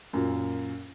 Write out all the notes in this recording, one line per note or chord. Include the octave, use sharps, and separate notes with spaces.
F#2 A#2